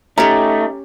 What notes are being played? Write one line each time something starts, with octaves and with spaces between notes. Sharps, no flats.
A3 C#4 D#4 G4 A#5